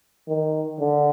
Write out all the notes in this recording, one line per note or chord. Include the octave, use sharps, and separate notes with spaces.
D#3
D3